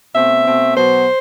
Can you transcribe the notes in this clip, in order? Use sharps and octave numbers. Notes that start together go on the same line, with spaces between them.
B2 A3 C4 E5
B2 A3 C4
B2 F#3 B3 C5